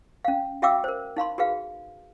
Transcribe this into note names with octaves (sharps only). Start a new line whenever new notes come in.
C#4 F5
F#4 E5 F5 G5 D6 E6
A#4 C5
D#4 F5 B5 C6
F#4 G#4 B4 F5